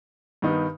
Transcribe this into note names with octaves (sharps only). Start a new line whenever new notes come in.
G2 D#3 B3 D#4